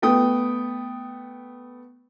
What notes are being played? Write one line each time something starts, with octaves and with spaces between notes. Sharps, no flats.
A3 B3 G5 D#6